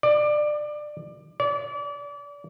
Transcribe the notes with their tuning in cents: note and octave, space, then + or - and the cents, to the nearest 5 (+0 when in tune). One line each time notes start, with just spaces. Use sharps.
D5 +20
D5 -35